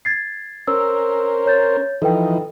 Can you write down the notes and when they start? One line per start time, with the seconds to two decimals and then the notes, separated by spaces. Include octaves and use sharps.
0.05 G#6 A6 C7
0.67 C#4 A#4 C5 E6
1.46 C#5 G6 A6
2.02 E3 F3 D#4 A4 B4 G5